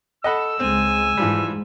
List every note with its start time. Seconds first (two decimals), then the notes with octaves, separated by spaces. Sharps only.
0.24 A4 D#5 F#5 B5 E6
0.60 C#2 G#3 C4 G#5
1.18 G#2 E3 F3 G3